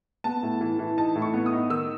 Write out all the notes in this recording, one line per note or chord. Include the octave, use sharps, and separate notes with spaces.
B3 A5
A2
E3
E3
D#4 A5
A2
C#6
B3
D#6
D#4
D#3 E6